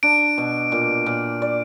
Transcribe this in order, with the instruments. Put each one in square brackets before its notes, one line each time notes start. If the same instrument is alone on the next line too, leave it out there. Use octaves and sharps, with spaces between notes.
[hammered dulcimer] D4 [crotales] D7
[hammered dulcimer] B2
A#2
A#2
D5